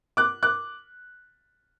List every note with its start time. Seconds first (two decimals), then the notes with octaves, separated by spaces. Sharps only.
0.17 D6 F#6
0.43 D6 F#6